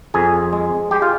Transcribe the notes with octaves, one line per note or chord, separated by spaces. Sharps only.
F2 G#4
G#3
G#3 G4
F4